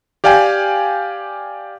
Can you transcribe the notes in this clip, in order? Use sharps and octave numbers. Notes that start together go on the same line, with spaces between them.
G4 D5 F5 G5 G#5